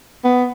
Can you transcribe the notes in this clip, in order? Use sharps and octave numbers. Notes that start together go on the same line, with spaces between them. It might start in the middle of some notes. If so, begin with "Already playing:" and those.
B3